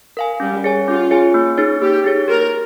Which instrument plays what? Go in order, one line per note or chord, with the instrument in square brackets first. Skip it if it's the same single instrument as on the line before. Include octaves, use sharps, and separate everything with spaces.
[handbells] A#4 F5 G#5
[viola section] G3 [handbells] C#4
[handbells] G#4 C#5 G#5
[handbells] C#4 [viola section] F4
[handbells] G#4 C#5 G#5
A#3
D#4 G#4 C#5
[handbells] A#3 [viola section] G4
[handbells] D#4 G#4 C#5
[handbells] G4 [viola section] A#4